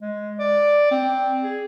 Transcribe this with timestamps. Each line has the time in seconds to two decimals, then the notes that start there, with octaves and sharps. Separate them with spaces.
0.02 G#3
0.39 D5
0.91 C4
1.43 G#4